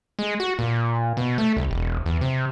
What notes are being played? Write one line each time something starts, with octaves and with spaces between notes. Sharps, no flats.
G#3
F#4
A#2
B2
A3
C2
E1
E2
C3